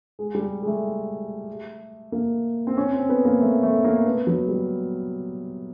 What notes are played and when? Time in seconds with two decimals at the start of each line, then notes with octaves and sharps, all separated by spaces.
0.19 G#3
0.35 G3
0.62 G#3
0.67 A3
2.12 A#3
2.67 C4
2.77 C#4
2.93 C4
3.09 B3
3.25 A#3
3.41 A3
3.63 A3
3.84 A#3
4.06 B3
4.27 F#3
4.48 G3